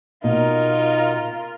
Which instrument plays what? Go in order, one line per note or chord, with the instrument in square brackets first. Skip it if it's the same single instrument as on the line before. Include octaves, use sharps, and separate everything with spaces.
[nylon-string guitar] B2 [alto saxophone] D#4 [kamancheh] F4 A#4